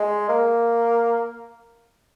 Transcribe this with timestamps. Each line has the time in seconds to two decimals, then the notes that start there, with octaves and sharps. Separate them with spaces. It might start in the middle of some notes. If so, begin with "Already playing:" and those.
Already playing: G#3
0.29 A#3